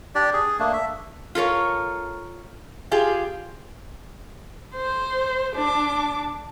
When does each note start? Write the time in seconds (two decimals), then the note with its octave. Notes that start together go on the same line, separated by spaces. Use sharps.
0.15 D4 G4 D5
0.33 G#4
0.59 A3 A#3 D4
0.73 E5
1.35 F4 A4 A#4 C#5
2.91 F4 G4 G#4
4.75 C5
5.56 D4 D6